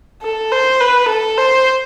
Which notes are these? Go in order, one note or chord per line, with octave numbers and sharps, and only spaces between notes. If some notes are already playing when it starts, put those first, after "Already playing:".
A4
C5
B4
A4
C5